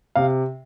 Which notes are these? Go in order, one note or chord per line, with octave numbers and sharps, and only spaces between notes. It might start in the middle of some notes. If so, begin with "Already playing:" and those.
C3 F5